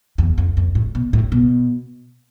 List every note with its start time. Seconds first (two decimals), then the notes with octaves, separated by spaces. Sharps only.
0.18 E2
0.38 F2
0.57 F2
0.75 A2
0.95 B2
1.13 A2
1.32 B2